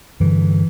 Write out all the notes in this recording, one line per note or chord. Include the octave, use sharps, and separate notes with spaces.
G2 D3 E3